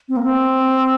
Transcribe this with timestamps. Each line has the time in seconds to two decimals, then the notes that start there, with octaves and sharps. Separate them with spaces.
0.09 C4
0.17 A#3
0.23 C4